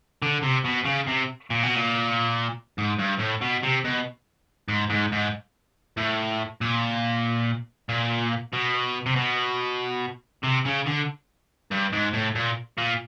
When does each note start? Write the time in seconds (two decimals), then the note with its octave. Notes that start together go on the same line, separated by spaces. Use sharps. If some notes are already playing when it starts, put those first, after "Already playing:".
0.22 D3
0.43 C3
0.65 B2
0.86 C#3
1.08 C3
1.50 A#2
1.63 B2
1.75 A#2
2.78 G#2
2.99 G2
3.20 A2
3.42 B2
3.63 C3
3.84 B2
4.68 G#2
4.90 G#2
5.12 G#2
5.97 A2
6.61 A#2
7.89 A#2
8.53 B2
9.06 C3
9.16 B2
10.43 C3
10.65 C#3
10.86 D3
11.71 G2
11.92 G#2
12.13 A2
12.35 A#2
12.78 A#2